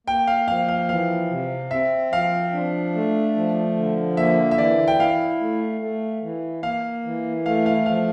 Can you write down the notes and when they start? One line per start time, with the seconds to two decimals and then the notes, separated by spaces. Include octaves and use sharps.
0.07 A#3 G5
0.27 F5
0.48 F3 F5
0.68 F5
0.89 E3 F5
1.30 C3
1.71 C4 E5
2.12 F3 F5
2.53 D4
2.94 A3
3.35 F3
3.76 D3
4.17 A#3 E5
4.51 E5
4.58 E3 D5
4.88 G5
4.99 E4 F5
5.40 A3
5.81 A3
6.22 E3
6.63 A#3 F5
7.05 E3
7.45 A3 F5
7.66 F5
7.86 F3 F5